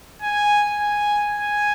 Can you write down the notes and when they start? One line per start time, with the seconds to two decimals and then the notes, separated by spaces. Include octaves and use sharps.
0.22 G#5
0.79 G#5
1.38 G#5